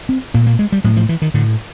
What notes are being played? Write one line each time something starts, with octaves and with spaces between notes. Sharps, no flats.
C4
A#2 A#3
A#3
G#3
G3
A2 F#3
F3
E3
D#3
A2 D3